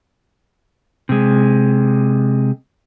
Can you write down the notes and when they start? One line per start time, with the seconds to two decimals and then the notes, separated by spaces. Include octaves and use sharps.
1.09 C3 G#3